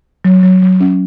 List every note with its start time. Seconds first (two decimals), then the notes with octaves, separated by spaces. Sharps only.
0.25 F#3
0.43 F#3
0.62 F#3
0.80 C#4